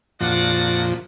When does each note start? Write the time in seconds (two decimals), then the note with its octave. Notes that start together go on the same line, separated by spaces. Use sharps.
0.21 F2 A#2 F3 F#4 D5 F#5